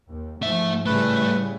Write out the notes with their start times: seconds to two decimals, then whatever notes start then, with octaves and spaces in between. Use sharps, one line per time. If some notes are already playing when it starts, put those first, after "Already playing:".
0.10 D#2
0.42 G#2 F3 A3 E5
0.86 A2 C#3 G3 A3 B4